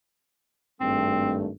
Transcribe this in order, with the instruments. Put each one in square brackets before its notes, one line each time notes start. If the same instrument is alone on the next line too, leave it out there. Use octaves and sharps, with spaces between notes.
[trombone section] G#1 G2 A3 [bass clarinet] C4